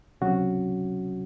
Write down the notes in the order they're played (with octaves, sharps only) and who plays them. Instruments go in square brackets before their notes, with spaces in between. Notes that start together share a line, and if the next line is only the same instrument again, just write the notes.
[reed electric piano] C#2 C3 F#3 C#4 F#4